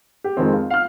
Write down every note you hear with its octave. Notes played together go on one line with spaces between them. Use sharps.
G4
F2 D#3 G#3 C4
F4
F5 F6